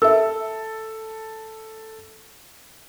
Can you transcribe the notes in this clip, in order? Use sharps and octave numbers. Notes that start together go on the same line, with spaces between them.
A4 E5 E6